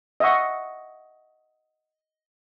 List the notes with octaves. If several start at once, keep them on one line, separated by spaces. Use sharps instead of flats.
D#5 E5 F#5 C#6